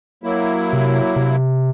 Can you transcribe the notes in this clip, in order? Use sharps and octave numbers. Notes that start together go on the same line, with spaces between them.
F#3 A#3 E4
C3
C3